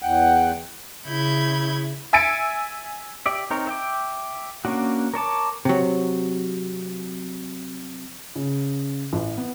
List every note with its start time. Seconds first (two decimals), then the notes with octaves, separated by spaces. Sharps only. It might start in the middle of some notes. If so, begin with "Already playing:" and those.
0.02 E2 F#5 G5
1.06 C#3 E4 B5 G6 G#6
2.13 E5 G#5 E6 A6 C#7 D7
3.26 G4 D5 E5
3.50 C4 D#4 A#4 C#5
3.67 E5 G5 D6
4.65 A#3 C#4 D4 F#4
5.14 A#4 C#5 A5 D6
5.65 C3 F#3
8.35 C#3
9.13 A1
9.37 B3